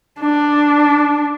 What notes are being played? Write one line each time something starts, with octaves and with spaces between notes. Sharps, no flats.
D4